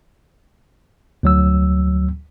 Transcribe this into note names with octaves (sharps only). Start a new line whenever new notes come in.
D2 F#3 E6